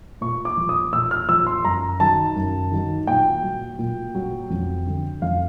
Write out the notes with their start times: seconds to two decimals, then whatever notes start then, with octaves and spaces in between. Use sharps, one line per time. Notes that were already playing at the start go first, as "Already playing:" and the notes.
0.21 A#2 C#6
0.45 D6
0.57 F3
0.69 D#6
0.93 A#2 E6
1.11 F6
1.29 F3 E6
1.47 C6
1.64 F#2 A#5
2.00 D#3 F#3 A5
2.36 F#2
2.71 D#3 F#3
3.07 A#2 G5
3.43 F#3
3.79 A#2
4.15 F#3
4.50 F2
4.86 D3 F#3
5.22 F2 F5